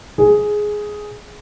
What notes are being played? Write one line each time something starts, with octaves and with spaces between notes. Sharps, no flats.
G#4